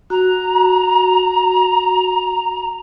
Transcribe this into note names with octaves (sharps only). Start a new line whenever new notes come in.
F#4 A#5